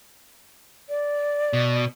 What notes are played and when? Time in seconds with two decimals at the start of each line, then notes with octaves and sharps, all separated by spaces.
0.89 D5
1.53 B2